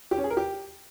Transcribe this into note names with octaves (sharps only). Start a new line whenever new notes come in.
G4
C#4
G#4
A#4
G4